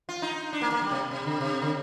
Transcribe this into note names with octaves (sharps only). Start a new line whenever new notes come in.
F4
D#4
D4
A#3
A#3
G3
C3
C3
D3
C3
D3